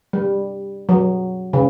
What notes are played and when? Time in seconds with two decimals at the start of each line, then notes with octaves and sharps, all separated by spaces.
0.13 G3
0.89 F#3
1.53 C#3